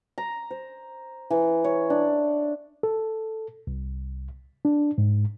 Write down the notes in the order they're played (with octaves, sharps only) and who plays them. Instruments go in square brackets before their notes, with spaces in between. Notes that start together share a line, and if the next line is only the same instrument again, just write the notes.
[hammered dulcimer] A#5
C5
E3
C#5
D4
[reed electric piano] A4
C2
D4
G#2